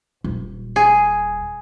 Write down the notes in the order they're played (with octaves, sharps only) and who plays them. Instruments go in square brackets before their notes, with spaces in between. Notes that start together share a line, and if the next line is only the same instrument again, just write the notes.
[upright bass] D#1
[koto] G#4